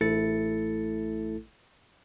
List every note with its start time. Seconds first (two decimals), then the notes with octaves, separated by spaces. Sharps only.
0.01 A1 A3 E4 A4 A6 C#7